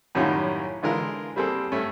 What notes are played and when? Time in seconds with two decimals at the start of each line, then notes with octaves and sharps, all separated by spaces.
0.15 F#2 A2 D#3 G3 C#4 F4
0.82 D3 E3 G#3 F4 A#4
1.36 G3 A#3 C4 G#4 A4
1.72 G2 A3 C#4